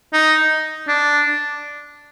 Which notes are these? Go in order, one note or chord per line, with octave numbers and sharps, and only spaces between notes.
D#4
D4